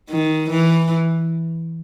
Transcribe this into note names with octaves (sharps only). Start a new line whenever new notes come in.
D#3
E3